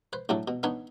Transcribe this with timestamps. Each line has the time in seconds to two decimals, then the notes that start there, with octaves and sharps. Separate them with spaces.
0.13 B4 C5
0.29 A2 F#3 A3 D4 A4
0.48 B2
0.63 B3 D4 D#4 B4 C#5